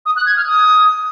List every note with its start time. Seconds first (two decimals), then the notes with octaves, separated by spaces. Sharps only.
0.06 D#6
0.16 F#6
0.26 G#6
0.37 F6
0.47 D#6